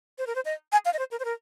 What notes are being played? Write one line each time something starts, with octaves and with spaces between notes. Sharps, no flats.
C5
A#4
C5
D#5
G#5
F5
D#5
C5
A#4
C5
A#4